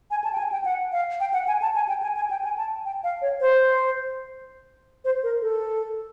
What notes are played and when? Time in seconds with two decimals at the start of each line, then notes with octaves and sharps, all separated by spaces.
0.11 G#5
0.24 A5
0.33 G5
0.38 G#5
0.52 G5
0.65 F#5
0.92 F5
1.20 G5
1.34 F#5
1.48 G#5
1.62 A5
1.75 G#5
1.89 G5
2.03 G#5
2.16 G#5
2.31 G5
2.44 G#5
2.58 A5
2.85 G5
3.04 F5
3.22 C#5
3.41 C5
5.05 C5
5.23 A#4
5.42 A4